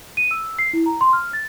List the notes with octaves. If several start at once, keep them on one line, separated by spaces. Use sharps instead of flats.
D#7
E6
C7
E4
A#5
C6
F6
A6